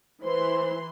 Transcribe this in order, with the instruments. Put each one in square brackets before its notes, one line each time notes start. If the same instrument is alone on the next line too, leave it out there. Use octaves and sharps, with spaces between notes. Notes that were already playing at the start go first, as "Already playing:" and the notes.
[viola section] E3 C6 [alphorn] C5